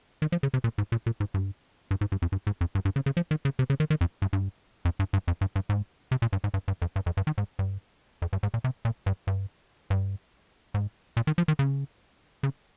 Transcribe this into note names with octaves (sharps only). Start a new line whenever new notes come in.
D#3
F3
C#3
C3
A#2
G#2
A#2
A#2
G#2
G2
G2
G#2
G2
F2
G2
G#2
F2
G2
G2
C#3
C#3
F3
D#3
C#3
C3
C#3
D#3
D#3
F2
G2
G2
F2
G2
G2
F2
G2
G2
G#2
C3
A#2
G2
G#2
G2
G2
F2
G2
F2
G2
D#3
G#2
G2
F2
G2
G#2
A#2
C3
A#2
G2
G2
G2
G#2
A#2
D#3
F3
D#3
C#3
C#3